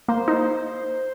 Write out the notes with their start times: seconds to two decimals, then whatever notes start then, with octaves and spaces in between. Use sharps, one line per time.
0.08 A#3 C5
0.28 D#4